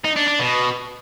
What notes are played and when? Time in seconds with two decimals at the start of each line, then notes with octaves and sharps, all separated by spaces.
0.04 D#4
0.16 D4
0.27 D4
0.39 B2